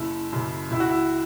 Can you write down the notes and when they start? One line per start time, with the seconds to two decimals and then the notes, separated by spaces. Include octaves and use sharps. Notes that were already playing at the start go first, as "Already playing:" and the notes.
Already playing: F#1 E4
0.33 F#2 C#3
0.71 C#2 E4
0.80 F#4
0.90 E4